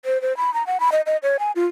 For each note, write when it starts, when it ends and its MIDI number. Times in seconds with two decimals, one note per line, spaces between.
0.05 0.21 72
0.22 0.36 72
0.37 0.53 83
0.54 0.65 82
0.67 0.80 78
0.80 0.90 83
0.92 1.01 75
1.06 1.17 75
1.23 1.37 73
1.39 1.52 80
1.56 1.66 65